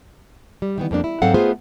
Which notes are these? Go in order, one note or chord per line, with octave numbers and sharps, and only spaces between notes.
G3
D#3 E3 B3
F2 A#3 D4
E4
G#2 F#3 C4 A4 F5 F#5
A3 B3 F4 G#4 C5